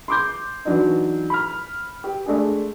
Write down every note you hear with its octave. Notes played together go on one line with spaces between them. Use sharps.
C6 D6 G6
E3 F#3 D4 D#4
B5 F6
G4
G#3 A3 D4 G#4